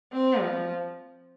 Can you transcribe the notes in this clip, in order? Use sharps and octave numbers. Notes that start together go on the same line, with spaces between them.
C4
F3